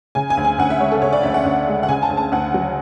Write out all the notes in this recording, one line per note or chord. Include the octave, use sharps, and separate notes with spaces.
C#3 G#5
G#5
D2
G#5
D2 F#5
E5
G#3 C#5
A4
C#3 C#5
D5
D2 E5
F#5
D2
G#3
F#5
C#3 G#5
A5
D2
A5
D2 F#5
F#3